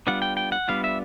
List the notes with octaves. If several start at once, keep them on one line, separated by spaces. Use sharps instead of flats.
G3 B3 D4 F4 F#5
G5
G5
F#5
G3 B3 D4 F4 F5
E5